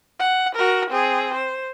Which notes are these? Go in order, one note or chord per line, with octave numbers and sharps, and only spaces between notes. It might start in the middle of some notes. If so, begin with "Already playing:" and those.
F#5
F#4 A#4
C4 G#4
C5